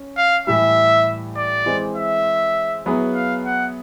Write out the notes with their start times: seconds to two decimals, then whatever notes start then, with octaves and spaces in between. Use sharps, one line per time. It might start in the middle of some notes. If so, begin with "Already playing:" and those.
Already playing: C#4
0.17 F5
0.47 A2 E3 G3 E5
1.37 D5
1.66 E3 G#3 C4
1.96 E5
2.86 F#3 B3 E4 G#4 B4
3.15 F5
3.45 F#5